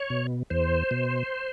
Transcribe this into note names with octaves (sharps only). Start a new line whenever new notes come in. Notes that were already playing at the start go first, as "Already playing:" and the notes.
Already playing: C#5
B2
E2 C5
B2